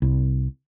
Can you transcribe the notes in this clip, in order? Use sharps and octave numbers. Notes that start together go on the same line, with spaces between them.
C2